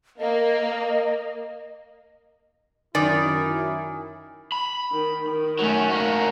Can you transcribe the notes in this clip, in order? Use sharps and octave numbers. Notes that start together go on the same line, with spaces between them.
A#3 D#5
F#2 D#3 E4 D5 G#5
B5
D#3
D#3
F#3 A3 C#4
A#3 F#4